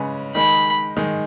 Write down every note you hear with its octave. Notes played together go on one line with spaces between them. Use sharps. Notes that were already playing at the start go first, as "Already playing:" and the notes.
Already playing: C#3 G#3 C#4 B4
D#3 G#3 D#4 B5
D#3 G#3 D#4